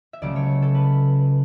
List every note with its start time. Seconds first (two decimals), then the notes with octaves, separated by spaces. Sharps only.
0.13 E5
0.22 C#2 C#3 F#3 A3 D5
0.36 C#5
0.62 A4
0.75 B4